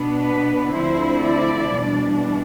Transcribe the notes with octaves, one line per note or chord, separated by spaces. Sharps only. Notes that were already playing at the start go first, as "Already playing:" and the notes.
Already playing: B2 B3 D4
B4
D2 D3 F3 C4 E4 C5
D5
E2 B2 G3 D4